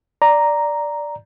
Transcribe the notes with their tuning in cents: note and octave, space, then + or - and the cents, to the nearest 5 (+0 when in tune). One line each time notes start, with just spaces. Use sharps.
D5 +0 A#5 +0